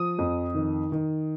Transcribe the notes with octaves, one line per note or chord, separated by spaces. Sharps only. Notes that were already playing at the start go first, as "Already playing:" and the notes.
Already playing: F3 D#6
F2
D#3
D#3